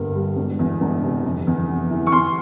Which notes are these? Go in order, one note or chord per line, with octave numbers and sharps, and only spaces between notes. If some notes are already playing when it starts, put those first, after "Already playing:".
Already playing: G1 G2 A#3
G3
E1
E2
E1
C3
F1
E2
F1
E3
C#6
E2 C6